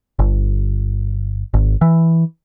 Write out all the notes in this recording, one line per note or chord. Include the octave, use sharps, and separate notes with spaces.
G1
G#1
E3